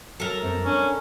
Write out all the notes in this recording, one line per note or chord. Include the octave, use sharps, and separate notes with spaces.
F#3 A4 A#4
F#2 C4 C#5
C#4 D4